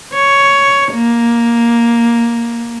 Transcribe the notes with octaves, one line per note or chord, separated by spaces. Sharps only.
C#5
A#3